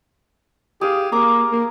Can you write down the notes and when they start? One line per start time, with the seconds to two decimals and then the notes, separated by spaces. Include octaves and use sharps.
0.81 G4 G#4 F5
1.12 A#3 A#5 D6
1.52 A#3